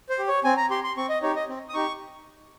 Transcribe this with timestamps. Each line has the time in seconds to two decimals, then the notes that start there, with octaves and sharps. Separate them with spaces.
0.09 C5
0.19 G4
0.28 C#5
0.44 C4 G#5
0.57 A#5
0.70 G4 C6
0.84 C6
0.97 C4 C#6
1.09 D#5
1.22 D#4 G4 C#5
1.35 D#5
1.49 C4
1.69 D#6
1.74 D#4 G4 C#6